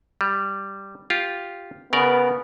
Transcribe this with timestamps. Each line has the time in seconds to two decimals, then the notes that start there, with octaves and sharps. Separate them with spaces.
0.21 G3
1.10 F4 G4
1.93 C#3 B3 A#4 D5